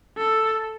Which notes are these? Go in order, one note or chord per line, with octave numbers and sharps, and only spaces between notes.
A4